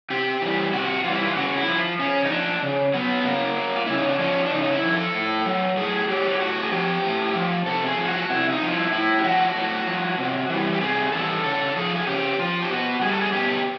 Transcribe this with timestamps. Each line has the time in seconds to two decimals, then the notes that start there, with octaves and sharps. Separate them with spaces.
0.10 C3 G4
0.42 E3 G3
0.73 C3 F#4
1.04 E3 G3 F4
1.15 E4
1.25 F4
1.36 C#3 F#4
1.57 E4
1.68 F3
1.99 C#3 C#4
2.25 D#4
2.31 F3 D4
2.63 C#3
2.93 F#3 B3
3.25 C#3 A#3
3.56 F#3
3.76 F4
3.86 C#3 E4
3.98 D#4
4.09 D4
4.19 F3 C#4
4.45 D4
4.51 C#3 D#4
4.63 D#4
4.72 E4
4.83 F3
4.93 A4
5.14 A2
5.45 F#3
5.77 A2 G#4
6.09 F#3 G4
6.35 G4
6.40 A2 F#4
6.62 G#4
6.72 F3 G4
7.03 A2
7.35 F3
7.66 C3 A4
7.87 G#4
7.98 F3
8.08 F#4
8.29 C3 E4
8.50 D#4
8.61 F3
8.71 E4
8.92 A2 E4
9.18 G4
9.24 F3 F#4
9.56 A2
9.87 F3
10.18 C3
10.50 E3 G3
10.74 G4
10.81 C3 G#4
11.12 E3 G3 A4
11.44 C#3 A4
11.76 F3 G#4
11.96 G#4
12.07 C#3 G4
12.39 F3 F4
12.62 G4
12.71 B2 F#4
13.01 G3 G#4
13.12 A4
13.21 G#4
13.33 B2 G4